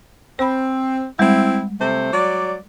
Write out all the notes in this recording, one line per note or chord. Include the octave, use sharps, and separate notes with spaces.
C4 C5 B5
G3 G#3 C4 E4
C3 A3 C5
F#3 D5